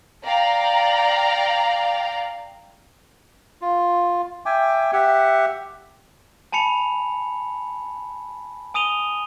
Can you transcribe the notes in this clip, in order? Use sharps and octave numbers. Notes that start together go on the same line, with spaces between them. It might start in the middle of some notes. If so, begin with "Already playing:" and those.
D5 F5 G5 A#5
F4
E5 G5 G#5 D6
G4 E5 F#5
G#5 A5 B5 C#7 F7
G#5 D#6 D#7 F7 G7